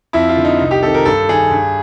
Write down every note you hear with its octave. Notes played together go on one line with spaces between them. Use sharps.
F2 E4
F4
D3
D#4
C2 D#4
G4
C3 D#3 A4
A#4
G2 A4
D#3 G#4
G2